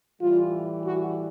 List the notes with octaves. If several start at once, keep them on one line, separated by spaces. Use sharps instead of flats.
A2 E3 G3 F4
F#4